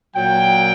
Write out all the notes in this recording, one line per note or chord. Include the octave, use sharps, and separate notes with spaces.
A#2 F#3 G5